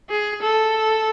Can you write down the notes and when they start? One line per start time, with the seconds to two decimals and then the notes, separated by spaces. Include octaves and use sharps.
0.10 G#4
0.43 A4